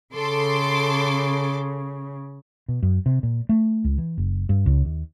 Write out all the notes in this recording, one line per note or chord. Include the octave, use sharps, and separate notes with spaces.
C#3 A4 C6 D6
B2
F#2
C3
A#2
A3
C#2
E3
F#1
G2
C#2
D#2